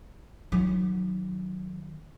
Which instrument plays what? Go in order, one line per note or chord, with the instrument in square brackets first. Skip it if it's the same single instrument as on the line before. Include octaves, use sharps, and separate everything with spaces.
[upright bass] D#3 F#3